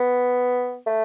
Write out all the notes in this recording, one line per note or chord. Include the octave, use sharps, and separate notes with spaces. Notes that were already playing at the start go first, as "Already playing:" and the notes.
Already playing: B3
A3